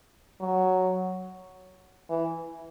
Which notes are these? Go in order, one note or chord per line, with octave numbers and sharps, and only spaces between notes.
F#3
E3